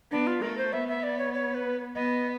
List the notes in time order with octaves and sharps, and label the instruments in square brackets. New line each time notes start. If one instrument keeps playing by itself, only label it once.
[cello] B3 [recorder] D4
[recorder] F4
[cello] A3 [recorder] A#4
[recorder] C5
[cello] B3 [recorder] E5
[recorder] E5
D5
C#5
C#5
B4
[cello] B3 [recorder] D#5